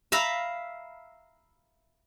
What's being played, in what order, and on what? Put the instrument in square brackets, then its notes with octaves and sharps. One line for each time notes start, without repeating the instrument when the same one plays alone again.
[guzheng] E5 F5 A#5 B5